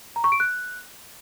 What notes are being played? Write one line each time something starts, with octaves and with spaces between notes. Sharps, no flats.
A#5
C#6
D7
F#6